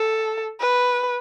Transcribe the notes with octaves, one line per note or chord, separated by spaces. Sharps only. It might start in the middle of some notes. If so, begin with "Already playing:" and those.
Already playing: A4
B4